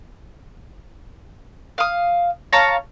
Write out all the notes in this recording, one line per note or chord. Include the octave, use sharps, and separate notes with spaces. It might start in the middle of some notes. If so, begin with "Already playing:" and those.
F5 D#6
C#5 F5 A5 A#5